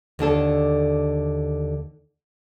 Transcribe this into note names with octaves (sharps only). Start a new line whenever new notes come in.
D#2 D3 D4 A4